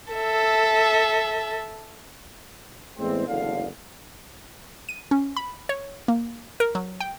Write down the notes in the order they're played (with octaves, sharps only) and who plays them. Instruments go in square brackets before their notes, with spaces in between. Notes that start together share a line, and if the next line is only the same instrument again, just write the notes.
[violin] A4 E5
[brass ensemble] E2 A2 G#3 C4
F#1 E2 A2 D3 F5
[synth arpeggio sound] D#7
C#4
B5
C#5
A#3
A#4
F#3
G5